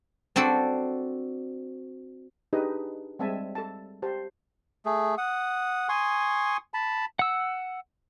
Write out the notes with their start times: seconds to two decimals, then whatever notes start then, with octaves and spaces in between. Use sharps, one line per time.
0.36 C4 D4 F#4 A4 D5
2.53 D4 D#4 G4 G#4 B4 D#5
3.19 G3 G#3 C4 E5 G#5 A5
3.55 A4 A5
4.02 G4 C5 A5
4.86 A3 G#4
5.18 F#5 D#6
5.89 G#5 C6 C#6 D#6
6.74 A5 B5
7.19 F#5 E6